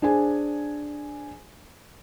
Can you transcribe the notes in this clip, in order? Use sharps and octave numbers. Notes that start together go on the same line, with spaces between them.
D4 G#4 C5 G#5